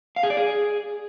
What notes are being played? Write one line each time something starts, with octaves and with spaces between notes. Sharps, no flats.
F5
G#4
D5
G#4